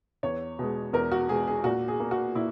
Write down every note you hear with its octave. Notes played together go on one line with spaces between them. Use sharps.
E2 C#5
B2 G#3
E2 A#4
F#4
B2 G#3 G#4
G#4
A#2 F#4
G#4
A#3
F#4
A#2 E4